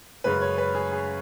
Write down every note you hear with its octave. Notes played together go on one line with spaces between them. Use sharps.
F#2 C#3 G#3 B4
C#5
B4
G#4
G#4